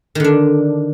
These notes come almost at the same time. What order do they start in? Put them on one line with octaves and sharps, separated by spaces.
D#3 D3 D4